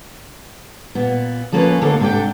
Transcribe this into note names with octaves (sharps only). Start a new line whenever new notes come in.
A#2 B3
F3 A3 A#3 C#4 F4 B4
D#2 D3 A#3 D#4 A4
G#2 C3 D4 A4 G5